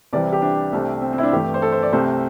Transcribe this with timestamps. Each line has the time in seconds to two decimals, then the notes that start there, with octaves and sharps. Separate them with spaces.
0.13 C2 C3 E3 G3 D5
0.33 G4
0.42 D4
0.73 C2 C3 A3
1.02 C4
1.13 C4
1.18 E4
1.23 D4
1.32 G2 E3 A3 G4
1.54 C5
1.62 A4
1.72 C5
1.83 D5
1.92 C2 C3 A3 C5